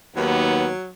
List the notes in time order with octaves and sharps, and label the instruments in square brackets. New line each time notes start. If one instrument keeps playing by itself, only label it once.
[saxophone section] D#2 [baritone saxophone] F#3 [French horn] B3